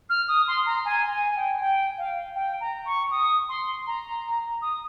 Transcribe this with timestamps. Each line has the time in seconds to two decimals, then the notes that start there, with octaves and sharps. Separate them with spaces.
0.10 F6
0.28 D#6
0.48 C6
0.66 A#5
0.85 G#5
1.11 G#5
1.36 G5
1.60 G5
1.98 F5
2.36 G5
2.61 A#5
2.86 C#6
3.11 D#6
3.49 C6
3.87 A#5
4.62 D#6